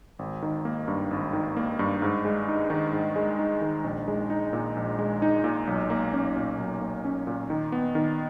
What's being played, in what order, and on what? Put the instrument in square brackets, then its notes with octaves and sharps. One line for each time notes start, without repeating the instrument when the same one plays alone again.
[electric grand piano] G#1
D#3
A#3
G2
G#1
D#3
A#3
G2
G#2
G#3
D#4
D#3
G#2
G#3
D#4
D#3
A#1
G#3
D#4
A#2
A#1
G#3
D#4
A#2
B1
A#3
C#4
A#2
B1
A#3
C#4
A#2
D#3
B3
D#3